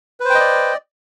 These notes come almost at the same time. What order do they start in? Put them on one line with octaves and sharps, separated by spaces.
B4 C5 G5 D#5 D5